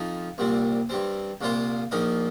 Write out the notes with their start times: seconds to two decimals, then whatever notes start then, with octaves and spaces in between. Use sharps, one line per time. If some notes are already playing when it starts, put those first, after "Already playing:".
Already playing: F2 F3 D#4
0.38 C2 A#2 G3 C4
0.89 G2 G3 C4
1.41 C2 A#2 A#3 F4 C5
1.91 A#1 A#2 F3 A#3 D#4